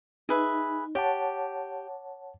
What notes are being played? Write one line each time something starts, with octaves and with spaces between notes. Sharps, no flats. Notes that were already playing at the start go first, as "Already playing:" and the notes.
D#4 G#4 B4 E5
G4 C#5 F#5 A5